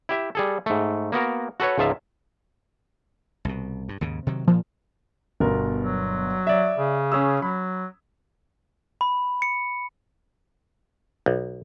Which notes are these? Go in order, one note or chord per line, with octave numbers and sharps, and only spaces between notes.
E4 G4 E5
G3 G#4 A4
G#2 A3
A#3 B3 F#4 A#4
F#4 A4 B4 C#5
C#2 G#2 F3 F4 E5 A5
C2 B2
G2
D#2 G#2 C#3
C3 D#3 F#3
A#2 F3
G1 B2 A#4
F#3
D5 E5
C#3
C#4 G#4 E6
F#3 B5
B5
C#7
B1